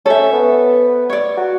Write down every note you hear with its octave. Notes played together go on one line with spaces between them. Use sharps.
C#4 A4 C5 E5
B3
C#5 D5
F#4